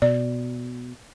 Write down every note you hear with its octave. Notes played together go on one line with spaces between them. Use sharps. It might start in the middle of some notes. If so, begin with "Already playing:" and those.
B2 D5